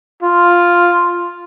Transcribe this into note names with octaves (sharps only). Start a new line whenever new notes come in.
F4